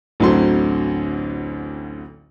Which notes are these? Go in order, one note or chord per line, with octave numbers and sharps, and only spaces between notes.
A1 D2 D3 F#3 C4 C6